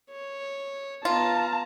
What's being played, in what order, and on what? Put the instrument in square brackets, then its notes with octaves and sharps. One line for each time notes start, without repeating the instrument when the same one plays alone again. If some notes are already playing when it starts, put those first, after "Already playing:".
[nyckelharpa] C#5
[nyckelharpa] B3 [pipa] F4 [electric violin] A5 A#5